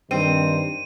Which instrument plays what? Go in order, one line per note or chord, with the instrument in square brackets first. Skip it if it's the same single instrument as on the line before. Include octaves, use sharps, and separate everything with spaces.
[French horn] G2 [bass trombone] D#3 [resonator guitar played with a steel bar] C4 [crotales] D#7